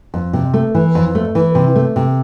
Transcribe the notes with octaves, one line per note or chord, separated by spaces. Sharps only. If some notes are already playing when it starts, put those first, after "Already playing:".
F2
C3
A3
E3
F2
A3
E3
C3
A3
C3